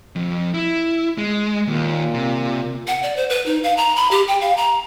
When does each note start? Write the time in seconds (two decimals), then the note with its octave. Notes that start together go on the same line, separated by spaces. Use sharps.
0.16 F2
0.54 E4
1.18 G#3
1.67 D#2 A#2
2.14 C3
2.87 F#5
3.03 D5
3.17 C5
3.30 B4
3.46 D#4
3.63 F5
3.77 A#5
3.96 B5
4.11 G4
4.28 G5
4.41 F5
4.57 A#5